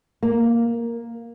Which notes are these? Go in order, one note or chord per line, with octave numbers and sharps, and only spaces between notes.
A#3